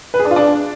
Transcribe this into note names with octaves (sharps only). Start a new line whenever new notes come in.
B4
G#4
D4
F4
D4